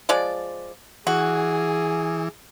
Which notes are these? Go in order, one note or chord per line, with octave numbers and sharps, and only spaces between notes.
F3 G#3 D5
E3 F#4 G#4